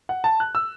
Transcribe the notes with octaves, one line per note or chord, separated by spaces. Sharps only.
F#5
A5
F#6
E6